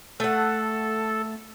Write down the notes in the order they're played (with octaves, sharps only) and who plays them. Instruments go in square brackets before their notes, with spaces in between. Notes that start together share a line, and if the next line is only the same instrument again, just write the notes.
[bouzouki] A3 F#5 [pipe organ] A4